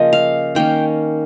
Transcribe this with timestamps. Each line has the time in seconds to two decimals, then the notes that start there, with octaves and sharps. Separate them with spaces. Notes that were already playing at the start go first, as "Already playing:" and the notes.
Already playing: C#3 F3 A#3 C#4 D#5
0.13 F5
0.55 D#3 A#3 C#4 G5